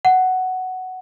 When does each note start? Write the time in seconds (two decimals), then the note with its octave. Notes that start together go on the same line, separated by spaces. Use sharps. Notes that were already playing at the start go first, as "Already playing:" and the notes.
0.05 F#5